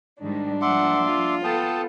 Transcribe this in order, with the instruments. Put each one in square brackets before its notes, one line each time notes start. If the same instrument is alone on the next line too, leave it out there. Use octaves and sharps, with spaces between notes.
[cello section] G#2 D#3 G3 [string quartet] D4
[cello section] F3 G3 A#3 [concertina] E5 C6 D6 [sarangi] F#5
[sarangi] F4
[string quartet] B3 [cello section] A4 [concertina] G5 A5 D#6